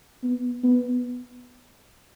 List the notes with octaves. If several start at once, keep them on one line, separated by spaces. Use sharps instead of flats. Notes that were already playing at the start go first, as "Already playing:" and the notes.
B3
B3